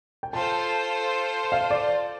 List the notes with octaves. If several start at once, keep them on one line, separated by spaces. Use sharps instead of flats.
G5
F4 A4 C5 A5
F5
D5